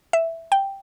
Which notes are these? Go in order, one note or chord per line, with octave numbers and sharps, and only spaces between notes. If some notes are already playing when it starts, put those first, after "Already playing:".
E5
G5